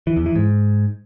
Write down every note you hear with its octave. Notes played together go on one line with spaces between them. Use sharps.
E3
E2
E3
G#2